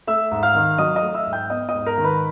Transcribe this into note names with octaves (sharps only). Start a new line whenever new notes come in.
A3 E5 E6
G#2
F5 F6
D#3
F#3 D#5 D#6
D#5 D#6
A3
E5 E6
G#2
G5 G6
B3 D#5 D#6
D#5 D#6
G#2
A#4 A#5
D#3
B4 B5